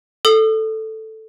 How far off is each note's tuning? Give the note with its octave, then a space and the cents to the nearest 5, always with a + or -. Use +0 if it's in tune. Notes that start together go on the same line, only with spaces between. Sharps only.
A4 +0 D#6 -30